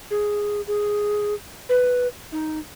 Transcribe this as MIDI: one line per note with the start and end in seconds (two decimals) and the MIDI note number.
0.11 0.61 68
0.67 1.34 68
1.69 2.07 71
2.32 2.59 63